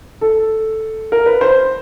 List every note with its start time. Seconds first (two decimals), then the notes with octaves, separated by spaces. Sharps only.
0.21 A4
1.12 A#4
1.26 B4
1.41 C5